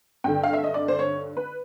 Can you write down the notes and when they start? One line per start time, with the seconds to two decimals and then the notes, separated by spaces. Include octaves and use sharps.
0.24 G2 D3 G5
0.43 F5
0.53 E5
0.64 D#5
0.74 D5
0.88 C5
0.99 C#5
1.37 B4